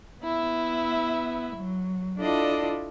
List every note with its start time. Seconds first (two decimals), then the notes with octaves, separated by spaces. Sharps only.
0.22 B3 E4 E5
1.55 F#3
2.20 D4 E4 F4 A4 D5 D#5